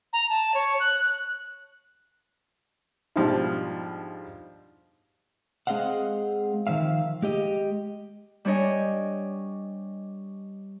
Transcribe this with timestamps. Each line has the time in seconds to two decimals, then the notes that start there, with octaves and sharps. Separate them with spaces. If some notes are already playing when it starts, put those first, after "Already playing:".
0.13 A#5
0.29 A5
0.54 C#5
0.80 F#6
3.16 G#2 B2 F3 G3 D4
5.67 G#3 C4 G#4 D#5 F5 F#5
6.67 D#3 F3 E5 F5
7.22 G#3 G4 D#5
8.45 G3 D4 C#5 D#5 G#5